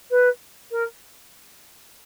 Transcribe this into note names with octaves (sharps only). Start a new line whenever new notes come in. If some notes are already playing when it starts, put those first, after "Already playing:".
B4
A#4